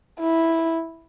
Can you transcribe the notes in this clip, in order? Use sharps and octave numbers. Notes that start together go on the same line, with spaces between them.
E4